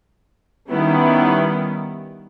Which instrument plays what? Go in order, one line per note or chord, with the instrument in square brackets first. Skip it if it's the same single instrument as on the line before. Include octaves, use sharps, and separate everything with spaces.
[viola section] D#3 G3 B3 C#4 E4